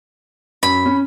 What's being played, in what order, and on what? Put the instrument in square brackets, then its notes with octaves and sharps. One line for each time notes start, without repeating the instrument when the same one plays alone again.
[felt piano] F#2 [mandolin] B5
[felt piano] C#4